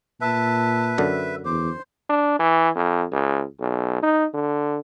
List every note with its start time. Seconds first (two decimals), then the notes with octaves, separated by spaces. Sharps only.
0.21 A#2 B4 E5 A5
0.98 F#2 D3
1.45 E2 C5 D6
2.09 D4
2.39 E3
2.76 F2
3.12 C#2
3.60 B1
4.03 D#4
4.34 D3